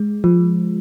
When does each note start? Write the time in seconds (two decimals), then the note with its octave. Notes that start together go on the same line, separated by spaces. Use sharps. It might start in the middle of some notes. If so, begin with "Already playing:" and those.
Already playing: G#3
0.24 F3